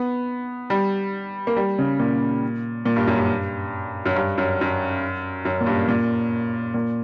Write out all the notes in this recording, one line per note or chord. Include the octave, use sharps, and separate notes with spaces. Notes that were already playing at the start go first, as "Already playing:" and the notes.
Already playing: B3
G3
A#3
G3
C#3
A#2
A#2
G2
F#2
G2
F#2
G2
F#2
F#2
F#2
A#2
G2
A#2
A#2